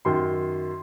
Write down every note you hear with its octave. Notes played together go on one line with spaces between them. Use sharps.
F#2 D#3 C6